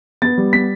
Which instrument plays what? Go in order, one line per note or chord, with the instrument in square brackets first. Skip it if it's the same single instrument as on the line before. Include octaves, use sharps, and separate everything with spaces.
[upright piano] B3 A6
G3
B3 B6